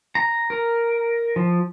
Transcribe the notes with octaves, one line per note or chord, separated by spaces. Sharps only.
A#5
A#4
F3